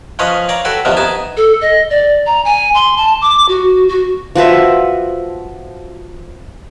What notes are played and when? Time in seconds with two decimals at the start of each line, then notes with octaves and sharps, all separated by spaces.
0.19 F3 C#4 B4 C#5 D#5 F5
0.49 C#5 D5 F5 A#5 C#6
0.65 F#4 A4 B4 C#5 G5
0.85 G2 C3 D#3 F3 A#3 B3
0.97 B3 D#4 G#5 A5
1.37 A4
1.61 D#5
1.91 D5
2.26 A#5
2.45 G#5
2.75 C6
2.97 A5
3.21 D6
3.49 F#4
3.89 F#4
4.36 F3 F#4 B4 E5